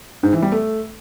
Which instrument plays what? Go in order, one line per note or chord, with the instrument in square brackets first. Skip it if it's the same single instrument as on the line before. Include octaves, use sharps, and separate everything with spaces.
[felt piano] G#2
E3
G3
A3